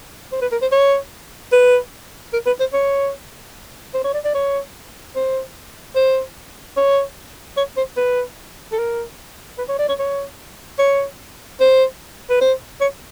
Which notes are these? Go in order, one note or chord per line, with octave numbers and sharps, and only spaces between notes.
C5
B4
A#4
C5
C#5
B4
A#4
B4
C5
C#5
C5
C#5
D5
D5
C#5
C5
C5
C#5
C#5
C5
B4
A4
A#4
B4
C#5
D5
C#5
C#5
C#5
C5
B4
C5
C#5